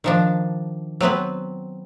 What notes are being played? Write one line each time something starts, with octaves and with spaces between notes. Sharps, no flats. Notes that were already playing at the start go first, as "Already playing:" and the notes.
D#3 F3 D4
F#3 B3 C4 B4